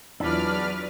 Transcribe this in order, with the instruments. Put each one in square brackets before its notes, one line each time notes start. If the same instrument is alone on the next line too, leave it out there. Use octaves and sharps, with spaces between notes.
[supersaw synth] E2 D5 F6 [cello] F#3 B4 [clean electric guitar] D4 [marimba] E4 F4